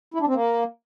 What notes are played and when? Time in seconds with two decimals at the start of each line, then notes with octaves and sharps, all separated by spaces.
0.14 E4
0.21 D4
0.28 C4
0.35 A#3